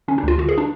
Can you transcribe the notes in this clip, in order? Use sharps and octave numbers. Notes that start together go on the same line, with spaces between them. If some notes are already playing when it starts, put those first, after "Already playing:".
D3 C#4
D4
D2 F4
D3 F#4
G#4
D4